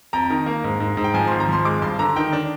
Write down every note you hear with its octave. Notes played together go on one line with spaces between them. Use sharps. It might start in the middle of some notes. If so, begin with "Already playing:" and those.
F2 A#5
D#3
A#3
G#2
G#2
G#2
G5
F3 G#5
G#1 C6
A#5
F3 C6
G#3 D6
G2 C6
D3 A#5
D#3 G5
D4